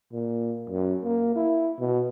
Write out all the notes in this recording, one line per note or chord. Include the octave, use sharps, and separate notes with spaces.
A#2
F#2
A#3
E4
B2